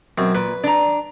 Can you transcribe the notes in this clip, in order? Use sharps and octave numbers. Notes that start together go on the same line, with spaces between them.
F#2 B2 C4
A#2 B4
D4 A#5